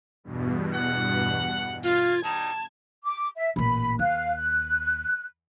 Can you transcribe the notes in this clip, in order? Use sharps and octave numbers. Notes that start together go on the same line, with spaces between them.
E2 G2 B2
F#5
F4 F5 G#6
G3 D#4 A5
D6
E5
A1 A#2 B5
D#2 F5 F#6
F#6